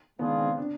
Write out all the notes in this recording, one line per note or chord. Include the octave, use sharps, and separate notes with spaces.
D#3 G#3 B3 D4 F4 G#4
C4
D4